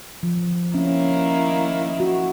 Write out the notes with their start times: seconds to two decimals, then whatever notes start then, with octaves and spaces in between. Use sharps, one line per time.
0.23 F3
0.74 D#3 A#3 C#4 E4
2.00 F#4